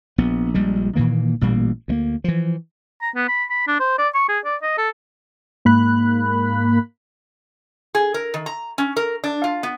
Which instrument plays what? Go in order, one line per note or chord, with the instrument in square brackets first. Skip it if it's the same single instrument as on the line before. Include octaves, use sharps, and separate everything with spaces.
[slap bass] A#1 B3
A#1 G3 G#3
A#2 D#3 E3 A#3
A1 A#2 G3 A#3
D2 G#3 A#3
E3 F3
[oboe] A#5
B3
B5
B5
D4
C5
D5
C#6
G#4
D5
D#5
A4
[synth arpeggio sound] G#2 A#3 B5 F#6
[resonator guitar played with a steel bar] G#4
A#4
D#3
A#5
C#4
A#4
D4
F4
B3